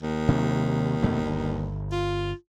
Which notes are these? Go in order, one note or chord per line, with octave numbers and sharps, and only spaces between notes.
D#2
C3 D#3 F#3
F2 B2 A3
G1
F4